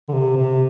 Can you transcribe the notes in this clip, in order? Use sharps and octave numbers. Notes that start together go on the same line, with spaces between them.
D3
C3
C3